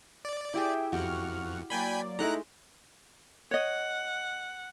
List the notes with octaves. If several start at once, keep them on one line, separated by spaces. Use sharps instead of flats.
D5
E4 G4 G#4 E5 G5
F2 F#4 G4 F#5 C#6 F6
F#3 A#3 D5 G5 G#5 B5 C6
G#3 A3 D#4 E4 A#5 F#6
C#5 D#5 F#5